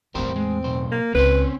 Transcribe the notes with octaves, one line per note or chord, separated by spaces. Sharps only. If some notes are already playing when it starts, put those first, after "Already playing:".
E2 A2 G3 C4 A#4 C5
G#3
B1 C5
A#3
C#2 C4 C#4 B4 C5